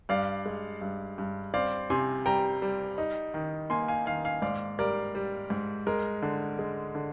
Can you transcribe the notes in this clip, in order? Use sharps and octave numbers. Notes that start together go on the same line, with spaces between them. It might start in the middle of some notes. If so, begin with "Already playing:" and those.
G2 D5 F5
G#3
G2
G2
C4 D5 F5
C3 G#5 C6
G3 G5 A#5
G3
D#4
D#3
A#3 G#5 C6
F5 G#5
D#3 F5 G#5
F5 G#5
G#2 D5 F5
G3 A#4 D5
G3
G#2
G#3 A#4
D3
G#3
D3